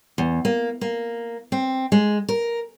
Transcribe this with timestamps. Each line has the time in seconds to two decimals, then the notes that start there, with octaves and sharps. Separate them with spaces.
0.18 E2
0.45 A#3
0.81 A#3
1.52 C4
1.92 G#3
2.29 A#4